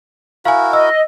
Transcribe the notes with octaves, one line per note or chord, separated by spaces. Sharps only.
E4 F#4 A#4 F5 G#5
D#5 E6